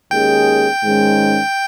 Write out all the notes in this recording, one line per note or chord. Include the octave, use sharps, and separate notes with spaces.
D#2 D#3 G#3 C#4 G#4 G5
G#2 D#3 G#3 C#4